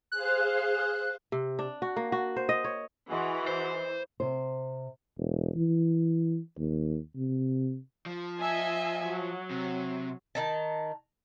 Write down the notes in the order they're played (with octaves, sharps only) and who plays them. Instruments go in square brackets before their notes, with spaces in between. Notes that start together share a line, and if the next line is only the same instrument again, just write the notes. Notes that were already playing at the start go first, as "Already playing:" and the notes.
[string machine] G#4 C5 F5 [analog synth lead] F#6
[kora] C3
D4
F#4
A#3
F#4
C5
D#5
C#5
[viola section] E3 [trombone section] F#4 [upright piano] G#4 D#5 C6
[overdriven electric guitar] C5
[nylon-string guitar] C3 C5
[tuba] E1
E3
D#2
C3
[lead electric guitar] F3
[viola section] D#5 E5 G#5
F#3
[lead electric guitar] C3
[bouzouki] D#3 D#4 A5